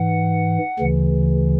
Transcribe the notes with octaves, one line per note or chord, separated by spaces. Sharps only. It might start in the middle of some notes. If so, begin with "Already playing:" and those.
Already playing: G#2 E3 F#5
D2 C#3 E3